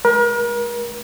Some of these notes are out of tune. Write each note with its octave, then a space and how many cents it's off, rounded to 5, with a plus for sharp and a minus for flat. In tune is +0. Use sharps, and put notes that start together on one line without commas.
G#3 +25 A#4 +40